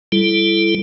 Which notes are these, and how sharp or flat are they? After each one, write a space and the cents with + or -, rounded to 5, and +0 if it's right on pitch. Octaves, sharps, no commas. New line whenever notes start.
G3 +0 E4 +25 A4 -20